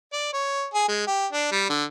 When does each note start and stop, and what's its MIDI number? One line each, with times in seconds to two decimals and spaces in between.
0.13 0.29 74
0.33 0.66 73
0.74 0.88 68
0.88 1.04 56
1.07 1.27 67
1.33 1.49 62
1.52 1.65 55
1.70 1.84 50